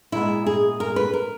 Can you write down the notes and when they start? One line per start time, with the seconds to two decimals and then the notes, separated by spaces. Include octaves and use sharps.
0.12 A#2 G#3 B3 E4
0.46 G#4
0.80 A#4
0.96 B4
1.13 A#4